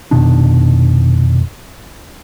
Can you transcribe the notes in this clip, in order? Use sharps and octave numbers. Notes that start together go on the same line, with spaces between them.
F1 B2 D#3 D4